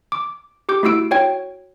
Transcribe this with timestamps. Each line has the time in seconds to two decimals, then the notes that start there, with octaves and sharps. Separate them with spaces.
0.12 D6
0.69 G4 D6 G6
0.83 A3 E4 F#4 E6 D7
1.11 F#4 C#5 G5 G#6